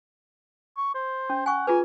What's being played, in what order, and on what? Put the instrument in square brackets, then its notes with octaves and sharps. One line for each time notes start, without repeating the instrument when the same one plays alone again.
[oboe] C#6
C5
[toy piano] C#4
[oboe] F#5 [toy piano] G#5 C#6
[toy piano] F4 G#4 B4 [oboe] G#5